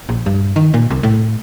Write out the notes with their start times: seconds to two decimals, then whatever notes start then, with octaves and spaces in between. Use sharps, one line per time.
0.09 A#1
0.26 G2
0.56 D#3
0.74 A#2
0.90 C2
1.03 A2